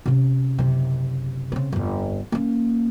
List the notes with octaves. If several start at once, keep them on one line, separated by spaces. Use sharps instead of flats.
C3 C#4
F#1 C3
C#3 C4
G1 F2
A#3 C#4